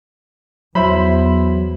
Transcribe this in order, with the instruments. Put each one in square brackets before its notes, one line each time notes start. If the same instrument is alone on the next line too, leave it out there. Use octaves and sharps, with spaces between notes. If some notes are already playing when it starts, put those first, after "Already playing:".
[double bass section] E2 [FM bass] F#3 [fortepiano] E4 C5 B5